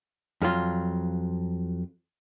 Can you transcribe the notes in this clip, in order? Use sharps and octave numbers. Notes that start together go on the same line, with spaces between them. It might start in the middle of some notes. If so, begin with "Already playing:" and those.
F2 F#3 F4